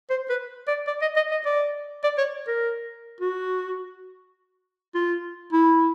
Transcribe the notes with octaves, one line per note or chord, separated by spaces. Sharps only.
C5
B4
D5
D5
D#5
D#5
D#5
D5
D5
C#5
A#4
F#4
F4
E4